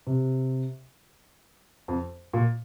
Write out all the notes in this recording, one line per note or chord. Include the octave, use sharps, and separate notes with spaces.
C3
F2
A#2